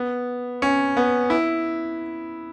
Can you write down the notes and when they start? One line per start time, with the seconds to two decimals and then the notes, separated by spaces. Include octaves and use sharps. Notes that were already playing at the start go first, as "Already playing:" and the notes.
Already playing: B3
0.62 C#4
0.97 B3
1.30 E4